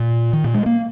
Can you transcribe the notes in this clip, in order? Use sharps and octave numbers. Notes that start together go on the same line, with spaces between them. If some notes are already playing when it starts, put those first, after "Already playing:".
Already playing: A#2
D#3
A#2
G#3
A#3